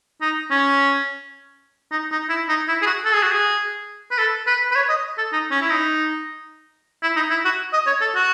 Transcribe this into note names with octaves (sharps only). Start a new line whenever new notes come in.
D#4
C#4
D#4
D#4
E4
D#4
E4
G#4
F#4
A4
G#4
F#4
G#4
B4
A4
B4
B4
C#5
D#5
A4
D#4
C#4
E4
D#4
E4
D#4
E4
F#4
D#5
C#5
A4
F#4